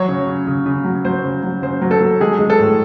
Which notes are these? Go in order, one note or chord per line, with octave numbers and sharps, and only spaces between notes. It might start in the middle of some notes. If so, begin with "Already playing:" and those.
Already playing: F#3 C#5
C#3
C#3
C#3
C#3
F#3
F#3 C5
C#3
F#3
C#3 C5
F#3
A4
F#3
G#3 G#4
G#3
A4
A2